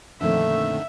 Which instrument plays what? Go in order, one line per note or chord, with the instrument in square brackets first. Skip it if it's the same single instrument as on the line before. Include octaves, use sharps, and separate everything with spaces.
[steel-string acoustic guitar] F2 A#2 C4 [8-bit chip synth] D3 D#3 [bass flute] A3 [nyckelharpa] E5